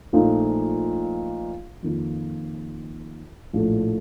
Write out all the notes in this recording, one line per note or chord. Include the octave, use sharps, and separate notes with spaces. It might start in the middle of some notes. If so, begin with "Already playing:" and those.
A#1 A#2 F3 A3 D#4
F2 D#3 A#3 F4
A#1 A2 A3